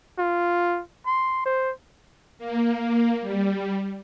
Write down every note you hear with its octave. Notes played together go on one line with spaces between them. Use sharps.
F4
C6
C5
A#3
G3